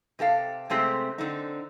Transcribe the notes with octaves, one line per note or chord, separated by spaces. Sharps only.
C3 G4 A4 F5
C3 G#3 A3 C4 G4
D3 C4 D#4